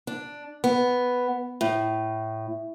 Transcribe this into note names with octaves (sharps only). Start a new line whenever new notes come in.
D4
B3
A2